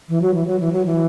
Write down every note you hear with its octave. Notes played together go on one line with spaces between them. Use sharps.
E3
F#3
E3
F#3
E3
F#3
E3